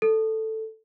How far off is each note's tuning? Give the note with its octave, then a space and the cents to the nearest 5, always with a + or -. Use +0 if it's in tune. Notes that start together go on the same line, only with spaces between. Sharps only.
A4 +5